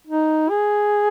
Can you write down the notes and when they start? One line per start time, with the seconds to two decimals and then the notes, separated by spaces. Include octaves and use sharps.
0.07 D#4
0.49 G#4